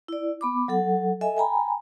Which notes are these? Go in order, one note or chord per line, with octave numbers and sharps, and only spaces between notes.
E4 D5
B3 B5 D6
F#3 A4 F#5
A4 D#5 E5 G#5
G5 G#5 A#5 B5